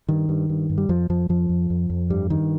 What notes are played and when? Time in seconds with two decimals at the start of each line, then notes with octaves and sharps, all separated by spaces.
0.09 G2 D#3
0.29 G2
0.49 G2
0.70 G2
0.78 G3
0.89 F2 F3
1.09 F2 F3
1.29 F2 F3
1.49 F2
1.70 F2
1.90 F2
2.10 G2 G3
2.30 G2 D#3